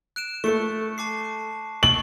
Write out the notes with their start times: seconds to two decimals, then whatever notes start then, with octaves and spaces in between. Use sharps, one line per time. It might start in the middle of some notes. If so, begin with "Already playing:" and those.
0.16 F#6 D7 E7
0.44 A3 A4 C#6 C#7
0.98 A5 D6 C7
1.83 C#6 F#7